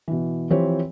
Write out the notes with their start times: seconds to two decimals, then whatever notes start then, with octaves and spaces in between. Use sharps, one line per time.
0.08 B2 E3
0.50 E3 F3 C4 G4 C#5